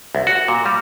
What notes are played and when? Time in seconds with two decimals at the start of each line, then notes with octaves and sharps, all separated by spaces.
0.15 C2
0.27 F#4
0.48 A#2
0.66 G3